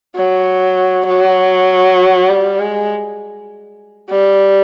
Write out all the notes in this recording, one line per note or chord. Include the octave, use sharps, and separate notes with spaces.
F#3
F#3
G3
G#3
G3